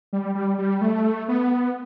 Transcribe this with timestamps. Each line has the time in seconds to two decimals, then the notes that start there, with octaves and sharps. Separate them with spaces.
0.13 G3
0.35 G3
0.58 G3
0.81 A3
1.28 B3